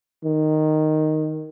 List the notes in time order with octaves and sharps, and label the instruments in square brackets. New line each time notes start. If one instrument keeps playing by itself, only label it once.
[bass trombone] D#3